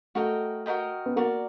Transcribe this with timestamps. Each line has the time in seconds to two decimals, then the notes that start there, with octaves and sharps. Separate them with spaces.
0.15 A3 F#4 A#4 D#5 G5
0.66 F#4 A#4 D#5 G5
1.06 B3
1.16 A#3 F#4 A#4 D5